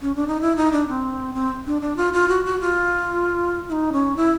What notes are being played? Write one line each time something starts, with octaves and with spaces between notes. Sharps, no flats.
C#4
D4
D#4
E4
D#4
D4
C4
C4
D4
D4
F4
F4
F#4
F#4
F4
E4
D#4
C#4
E4